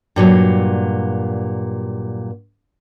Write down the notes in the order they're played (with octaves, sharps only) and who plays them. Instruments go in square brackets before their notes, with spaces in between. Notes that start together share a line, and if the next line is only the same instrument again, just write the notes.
[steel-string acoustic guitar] G2 A#2 F#3